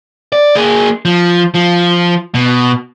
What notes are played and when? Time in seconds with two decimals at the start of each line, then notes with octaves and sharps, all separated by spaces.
0.33 D5
0.56 A#3 G#4
1.05 F3
1.54 F3
2.34 B2